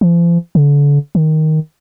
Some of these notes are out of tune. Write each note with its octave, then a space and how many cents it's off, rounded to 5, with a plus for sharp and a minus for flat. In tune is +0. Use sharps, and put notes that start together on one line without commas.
F3 -40
D3 -35
D#3 +5